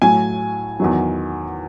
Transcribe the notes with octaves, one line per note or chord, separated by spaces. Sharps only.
A2 F#3 G#5
E2 D#3 F#3